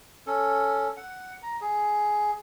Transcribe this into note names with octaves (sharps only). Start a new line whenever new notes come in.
C#4 A4
F#5
A#5
G#4